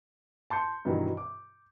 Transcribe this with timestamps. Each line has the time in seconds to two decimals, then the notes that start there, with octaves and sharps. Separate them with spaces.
0.50 A5 C6 G6 C#7
0.85 G2 B2 D#3 E3 F#3
1.17 D6